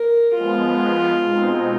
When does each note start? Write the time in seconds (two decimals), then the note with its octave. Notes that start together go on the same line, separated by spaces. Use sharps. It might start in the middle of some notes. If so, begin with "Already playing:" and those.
Already playing: A#4
0.35 F3 G#3 B3 F4
1.24 B2 G#3 C4 D#4